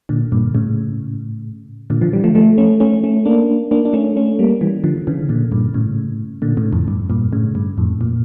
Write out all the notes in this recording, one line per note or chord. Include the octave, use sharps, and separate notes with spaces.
A#2 D3
G2 A#2
A2 C#3
A#2 D3
D3 F3
E3 G3
F3 A3
F3 A3
A3 C#4
A3 C#4
A3 C#4
A#3 D4
A#3 D4
D4
A3 C#4
A3 C#4
G3 A#3
E3 G3
D3 F3
C#3 E3
A#2 D3
G2 A#2
A2 C#3
A#2 D3
A2 C#3
F2 A2
G2
G2 A#2
A2 C#3
G2
F2 A2
A#2